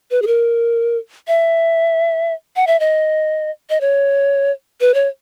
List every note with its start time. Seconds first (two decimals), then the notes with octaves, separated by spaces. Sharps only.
0.11 B4
0.22 G#4
0.27 A#4
1.28 E5
2.56 F#5
2.67 E5
2.80 D#5
3.70 D#5
3.81 C#5
4.81 B4
4.94 C#5